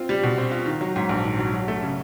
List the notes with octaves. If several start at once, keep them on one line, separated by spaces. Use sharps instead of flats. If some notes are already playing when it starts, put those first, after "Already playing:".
Already playing: C4 F4
G3
B2
C4
F4
D#3
F#3
G#2
A#1
D#3
F#3
F#3
A3
C#3